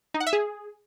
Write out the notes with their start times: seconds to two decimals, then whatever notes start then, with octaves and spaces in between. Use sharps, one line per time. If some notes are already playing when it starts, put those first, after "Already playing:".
0.14 D#4
0.20 F#5
0.27 E5
0.33 G#4